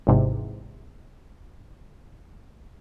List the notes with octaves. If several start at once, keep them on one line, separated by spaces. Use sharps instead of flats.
G#1 E2 G#2 C3